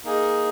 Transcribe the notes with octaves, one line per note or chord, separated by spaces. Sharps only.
A#3 D#4 G#4 D#5